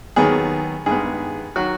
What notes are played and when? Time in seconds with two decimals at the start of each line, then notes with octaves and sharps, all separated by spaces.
0.16 D#2 D#3 F#3 B3 G#4
0.86 G2 D#3 G#3 B3 G#4
1.56 D#3 F#3 F#4